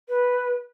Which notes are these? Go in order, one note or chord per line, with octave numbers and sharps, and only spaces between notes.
B4